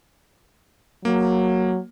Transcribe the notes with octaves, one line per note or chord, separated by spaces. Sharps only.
F#3 A#3